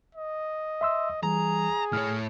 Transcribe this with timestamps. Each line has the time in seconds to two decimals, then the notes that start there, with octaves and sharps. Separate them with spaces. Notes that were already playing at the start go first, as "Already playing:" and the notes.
0.15 D#5
0.81 E5 C6 E6
1.23 E3 G3 G#4 A#5
1.93 A2 C#5 F6